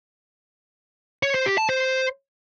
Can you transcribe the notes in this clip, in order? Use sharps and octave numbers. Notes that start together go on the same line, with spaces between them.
C#5
C5
G4
A5
C5